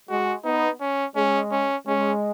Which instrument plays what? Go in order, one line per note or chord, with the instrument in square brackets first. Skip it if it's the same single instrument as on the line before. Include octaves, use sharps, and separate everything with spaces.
[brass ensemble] G#3 [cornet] F#4
[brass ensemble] B3 [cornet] D#4
[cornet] C#4
[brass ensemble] G#3 [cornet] C#4
[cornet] C#4
[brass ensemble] G#3 [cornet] C#4